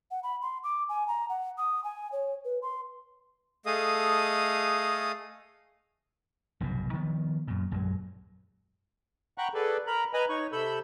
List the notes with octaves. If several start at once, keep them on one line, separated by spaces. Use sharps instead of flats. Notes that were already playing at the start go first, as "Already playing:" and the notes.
F#5
B5
C6
D6
G#5
A#5
F#5
D#6
G#5
C#5
B4
C6
A3 G#4 A4 D#5 F5 D#6
F1 B1 G2 A#2
D#3 F3 B3
F#2 A#2
A#1 F#2 F#3 G#3
F#5 G5 A#5 B5 C#6 F#6
G#4 A4 B4 D5
A#4 A#5 B5
B4 D#5 G#5 A#5 B5
D#4 C#5 C#6
C3 A4 B5 E6 G6